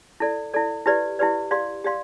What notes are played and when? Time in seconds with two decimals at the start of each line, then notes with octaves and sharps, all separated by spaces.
0.20 E4 A4 D5
0.54 E4 A4 D5
0.86 E4 G4 B4 D5
1.19 E4 G4 B4 D5
1.51 G4 D5 F5 C6
1.84 G4 D5 F5 C6